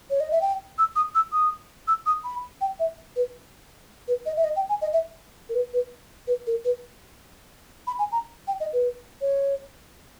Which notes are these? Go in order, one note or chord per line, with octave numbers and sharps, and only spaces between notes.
C#5
D#5
E5
G5
E6
D#6
E6
D#6
E6
D#6
B5
G5
E5
B4
B4
D#5
E5
D#5
G5
G#5
D#5
E5
A#4
B4
B4
B4
A#4
B4
B5
G#5
A#5
G5
D#5
B4
C#5